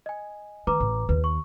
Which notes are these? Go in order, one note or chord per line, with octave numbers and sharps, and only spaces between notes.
D#5 G#5
D#3 B4 A#5 D6
A1
D#2 B4
C#6